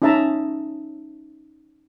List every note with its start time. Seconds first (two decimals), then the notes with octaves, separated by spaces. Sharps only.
0.02 C#4 D#4 G#4 E5 A5 A#5